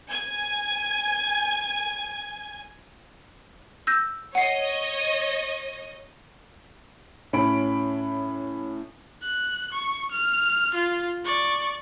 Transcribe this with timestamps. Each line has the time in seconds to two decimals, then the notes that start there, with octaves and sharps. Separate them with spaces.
0.10 G#5 G#6
3.87 E6 G6 A#6
4.35 C#5 D#5 F#5 C7
7.33 A2 C#4 B5 D7
9.22 F#6
9.73 C#6
10.12 F6
10.75 F4
11.25 D5 C#6